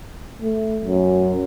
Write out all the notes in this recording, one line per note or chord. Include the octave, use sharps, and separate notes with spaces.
A3
F#2